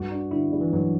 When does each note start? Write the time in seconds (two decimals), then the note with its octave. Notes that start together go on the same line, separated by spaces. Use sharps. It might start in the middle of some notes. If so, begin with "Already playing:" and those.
Already playing: G2 F#4
0.11 D4
0.31 D3 E4
0.52 G3
0.61 E3
0.73 G2 F#3